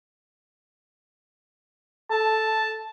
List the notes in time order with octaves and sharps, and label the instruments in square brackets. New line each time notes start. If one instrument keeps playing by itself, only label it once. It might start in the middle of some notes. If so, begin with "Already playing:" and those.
[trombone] A4 [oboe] A5